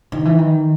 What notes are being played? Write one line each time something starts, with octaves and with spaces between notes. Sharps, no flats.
D#3
E3
D#3